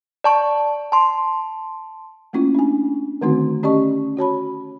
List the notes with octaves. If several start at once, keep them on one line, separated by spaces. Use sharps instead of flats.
D5 A5 C#6
A5 C6
A3 A#3 C#4 E4 F4
D4 G#5
D3 D#3 A3 C4 D#4 F#4
C#4 G4 D5 D#5 A5 C#6
F#4 C#5 A5 B5